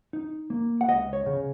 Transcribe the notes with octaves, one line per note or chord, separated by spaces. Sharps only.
D#4
A#3
F#5
C#2 D#5
C#5
C#3